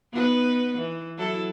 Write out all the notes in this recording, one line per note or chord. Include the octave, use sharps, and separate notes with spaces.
B3 D#4 B4
E3
F#3 E4 A4